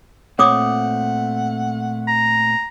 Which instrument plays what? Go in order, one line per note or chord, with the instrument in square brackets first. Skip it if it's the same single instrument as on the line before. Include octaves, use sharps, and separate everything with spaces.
[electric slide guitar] A#2 A3 C4 [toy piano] C#5 D6 D#6 [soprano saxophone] F#5
[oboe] A#5